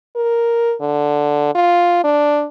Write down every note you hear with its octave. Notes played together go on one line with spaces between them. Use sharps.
A#4
D3
F4
D4